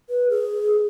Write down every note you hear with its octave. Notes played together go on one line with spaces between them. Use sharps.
B4
G#4